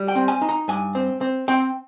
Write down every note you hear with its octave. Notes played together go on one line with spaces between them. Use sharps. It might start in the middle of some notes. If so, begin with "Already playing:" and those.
Already playing: G3
G5
C4
G#5
D#4
A#5
G2 G#5
C4
C4
C4 G5